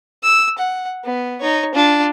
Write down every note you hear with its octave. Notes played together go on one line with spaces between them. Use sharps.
E6
F#5
B3
D#4 C#5
D4 F4